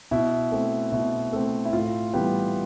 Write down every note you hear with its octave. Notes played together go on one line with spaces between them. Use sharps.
B2 E4
A3 C4
B2 E4
A3 C4
E4
A2 F4
E3 G3 B3 G4